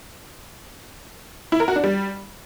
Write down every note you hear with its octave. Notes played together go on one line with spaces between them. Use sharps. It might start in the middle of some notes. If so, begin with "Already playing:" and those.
E4
A#4
F#4
D4
G3